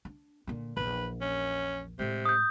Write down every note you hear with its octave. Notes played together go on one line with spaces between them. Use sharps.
D4
A#2 D3
A#1 E2 B4
C#4
A2 C3 G#3
D#6 G6